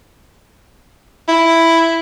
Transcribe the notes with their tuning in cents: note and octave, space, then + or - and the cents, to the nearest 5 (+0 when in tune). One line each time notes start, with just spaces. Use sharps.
E4 +5